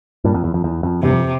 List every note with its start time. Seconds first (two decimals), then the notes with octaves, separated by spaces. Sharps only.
0.24 G2 A#2
0.34 F2
0.44 E2
0.54 F2
0.64 E2
0.83 F2
1.03 E2 G2 C3
1.13 F2